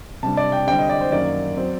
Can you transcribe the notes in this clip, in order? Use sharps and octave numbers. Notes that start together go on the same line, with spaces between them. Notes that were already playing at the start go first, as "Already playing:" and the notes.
C3 G3 D4 A5
D5
G5
D3 G3 C4 G5
D#5
D5
C5
F#2 D#3 F#3 A#3 D5
F#3 C4